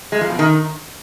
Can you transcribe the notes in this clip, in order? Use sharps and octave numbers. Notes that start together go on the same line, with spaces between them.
G#3
F3
B2
D#3